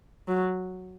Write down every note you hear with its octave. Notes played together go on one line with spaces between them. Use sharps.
F#3